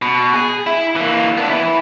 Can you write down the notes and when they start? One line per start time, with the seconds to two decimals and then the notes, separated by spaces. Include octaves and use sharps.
0.02 B2
0.33 G#4
0.67 E4
0.96 E3 A#3
1.37 B3 D4
1.50 E4 B4